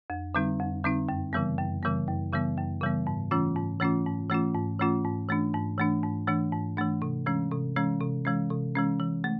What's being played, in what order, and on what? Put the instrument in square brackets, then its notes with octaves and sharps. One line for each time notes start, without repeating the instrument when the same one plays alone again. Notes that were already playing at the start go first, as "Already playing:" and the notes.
[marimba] F2
D3 G3 C4 D#4
F2
D3 G3 C4 D#4
F#2
C#3 E3 G3 B3
F#2
C#3 E3 G3 B3
F#2
C#3 E3 G3 B3
F#2
C#3 E3 G3 B3
G#2
E3 A3 C#4 F4
G#2
E3 A3 C#4 F4
G#2
E3 A3 C#4 F4
G#2
E3 A3 C#4 F4
G#2
E3 A3 D4
G#2
E3 A3 D4
G#2
E3 A3 D4
G#2
E3 A3 D4
C3
E3 G#3 C#4
C3
E3 G#3 C#4
C3
E3 G#3 C#4
C3
E3 G#3 C#4
E3
A3